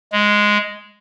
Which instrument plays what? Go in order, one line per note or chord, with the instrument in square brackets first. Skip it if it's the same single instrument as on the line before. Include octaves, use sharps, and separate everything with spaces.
[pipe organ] G#3